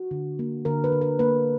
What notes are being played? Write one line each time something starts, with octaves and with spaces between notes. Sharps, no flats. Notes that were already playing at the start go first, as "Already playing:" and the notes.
Already playing: F#4
D3
A#3
D3 A#4
B4
D3
A#4
A#3 B4